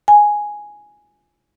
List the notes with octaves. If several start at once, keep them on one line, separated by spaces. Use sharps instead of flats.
G#5